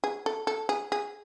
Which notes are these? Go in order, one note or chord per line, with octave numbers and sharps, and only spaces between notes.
G#4
A4
A4
G#4
G#4